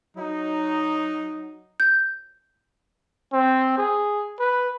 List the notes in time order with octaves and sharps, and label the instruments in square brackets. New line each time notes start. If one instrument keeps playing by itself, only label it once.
[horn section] F#3 D#4
[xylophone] G6
[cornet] C4
G#4
B4